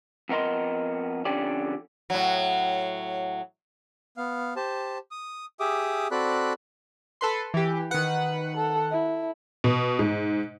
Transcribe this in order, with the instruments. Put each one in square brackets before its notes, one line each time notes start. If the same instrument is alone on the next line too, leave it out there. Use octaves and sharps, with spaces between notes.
[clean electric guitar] F2 B3 A#4 D#5 C6
F2 D3 C#4 G4 D5
[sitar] A2 F#3
[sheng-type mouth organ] B3 F5
G4 C5 A5
D#6
G4 G#4 E5 D6 D#6
C4 F#4 A4 D5 B5 F#6
[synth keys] A4 B4 C6
E3 G4
[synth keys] D#3 F#5 [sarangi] B4
[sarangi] A4
E4
[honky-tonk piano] B2
G#2